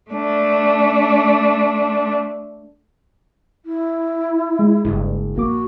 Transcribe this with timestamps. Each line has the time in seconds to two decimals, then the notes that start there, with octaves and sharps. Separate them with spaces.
0.11 A3 D4
3.65 E4
4.59 G#3
4.85 F#1 G2 G#3
5.36 A#1 A#3 F#4 D6